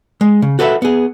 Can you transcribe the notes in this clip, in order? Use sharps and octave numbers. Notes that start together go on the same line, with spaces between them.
G#3
C#3
F#4 A4 B4 C5 E5
B3 G#4